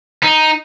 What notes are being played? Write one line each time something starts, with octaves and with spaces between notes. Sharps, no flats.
D#4